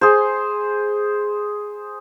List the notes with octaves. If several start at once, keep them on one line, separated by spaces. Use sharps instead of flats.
G#4 C5